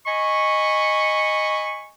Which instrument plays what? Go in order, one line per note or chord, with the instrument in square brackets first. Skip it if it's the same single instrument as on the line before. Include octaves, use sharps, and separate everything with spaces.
[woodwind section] D#5 G#5 B5 C#6